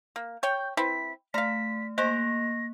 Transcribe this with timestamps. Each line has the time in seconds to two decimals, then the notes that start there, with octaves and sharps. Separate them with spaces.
0.16 A#3
0.43 C#5 G5 G6
0.77 C4 E4 B4 B6
1.34 A3 F5 A#5 B6
1.98 G#3 A#3 C5 A#6